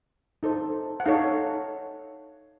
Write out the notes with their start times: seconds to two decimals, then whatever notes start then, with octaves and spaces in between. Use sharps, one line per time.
0.43 D#4 A4 C5
1.00 F#5
1.06 D#4 A4 C#5 F5